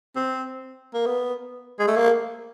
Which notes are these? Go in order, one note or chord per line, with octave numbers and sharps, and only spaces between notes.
C4
A#3
B3
G#3
A3
A#3